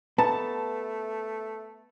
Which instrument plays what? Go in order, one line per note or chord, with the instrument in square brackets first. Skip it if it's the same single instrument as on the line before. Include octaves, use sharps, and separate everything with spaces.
[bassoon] A3 [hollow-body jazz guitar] B3 [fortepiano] A5